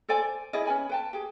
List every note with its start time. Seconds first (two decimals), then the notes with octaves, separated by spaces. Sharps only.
0.09 A4 C5 D5 G#5
0.53 E4 G#4 D5 D#5
0.65 C#4 B4 G#5 B5
0.89 B4 G5 A5
1.13 G4 G#4